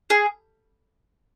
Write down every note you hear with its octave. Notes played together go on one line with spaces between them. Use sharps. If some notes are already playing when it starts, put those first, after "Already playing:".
G#4